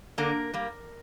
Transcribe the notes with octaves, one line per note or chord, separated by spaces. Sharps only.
D3 A#3 A#4
G3 A#3